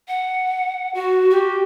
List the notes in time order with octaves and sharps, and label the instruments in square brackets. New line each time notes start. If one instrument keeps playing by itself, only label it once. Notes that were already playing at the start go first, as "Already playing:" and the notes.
[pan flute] F#5
F#4
[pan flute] F#4 [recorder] G4